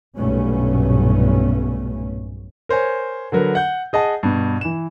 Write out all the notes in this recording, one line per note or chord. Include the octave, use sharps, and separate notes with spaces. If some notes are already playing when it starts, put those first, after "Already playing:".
B1 G2 A#2 A3 B3 C#4
A#4 C5 C#5 G#5
D3 F#3 A#4 B4
F#5 G6
G#4 D#5 F#5 A5
G2 B2
E3 E7